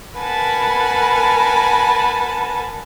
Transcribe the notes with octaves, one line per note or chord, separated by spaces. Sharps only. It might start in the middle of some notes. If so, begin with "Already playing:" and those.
A#4 B4 F#5 G#5 A5 B5